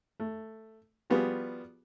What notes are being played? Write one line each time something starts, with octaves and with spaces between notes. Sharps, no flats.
A3
F3 G3 B3 F4 F#4 G#4